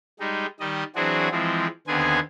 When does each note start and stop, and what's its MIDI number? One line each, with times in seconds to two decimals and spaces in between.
0.20 0.46 55
0.20 0.46 56
0.20 0.46 63
0.60 0.83 51
0.60 0.83 55
0.60 0.83 75
0.95 1.29 52
0.95 1.29 54
0.95 1.29 60
0.95 1.29 62
0.95 1.29 66
0.95 1.29 68
1.31 1.67 52
1.31 1.67 53
1.31 1.67 56
1.31 1.67 60
1.87 2.19 39
1.87 2.19 50
1.87 2.19 59
1.87 2.19 60
1.87 2.19 68
1.87 2.19 80